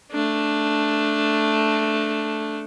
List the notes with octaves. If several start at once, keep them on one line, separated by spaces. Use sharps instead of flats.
A3 D4